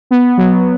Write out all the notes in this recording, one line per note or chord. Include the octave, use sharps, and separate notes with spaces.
B3
F#3